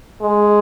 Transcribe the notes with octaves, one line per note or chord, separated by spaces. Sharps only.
G#3